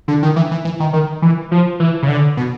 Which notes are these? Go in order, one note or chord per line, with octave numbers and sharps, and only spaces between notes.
D3
D#3
E3
E3
E3
D#3
D#3
E3
F3
E3
C#3
D3
B2